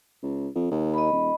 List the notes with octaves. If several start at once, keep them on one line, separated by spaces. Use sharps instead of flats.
C#2
F2
D#2
D#5 B5
D#1